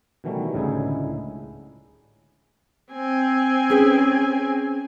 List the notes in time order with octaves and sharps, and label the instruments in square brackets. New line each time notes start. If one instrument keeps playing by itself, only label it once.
[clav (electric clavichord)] B2 D#3 E3 F#3 G3 A3
C#2 A2 D3 D#4 E4 G#4
[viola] C4 G#5
[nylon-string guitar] C#4 G#4 B4